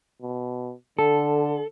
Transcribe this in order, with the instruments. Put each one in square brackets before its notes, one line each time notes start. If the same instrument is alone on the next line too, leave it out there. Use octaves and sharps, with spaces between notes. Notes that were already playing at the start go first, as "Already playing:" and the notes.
[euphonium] B2
[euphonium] D3 [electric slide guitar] A4